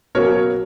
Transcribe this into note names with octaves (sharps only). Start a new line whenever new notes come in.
B2 F#3 A#3 C#4 A#4 C#5